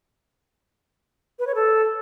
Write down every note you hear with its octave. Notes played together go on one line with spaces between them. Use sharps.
B4
C#5
A4